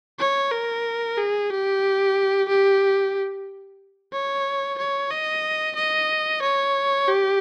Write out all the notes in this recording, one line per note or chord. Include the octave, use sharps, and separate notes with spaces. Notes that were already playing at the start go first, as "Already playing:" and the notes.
C#5
A#4
G#4
G4
G4
C#5
C#5
D#5
D#5
C#5
G4